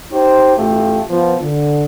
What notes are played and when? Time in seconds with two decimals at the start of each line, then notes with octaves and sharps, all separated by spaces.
0.12 D#4 G4 C5
0.57 A1 A3 F4 G4
1.10 F3 B3
1.41 D3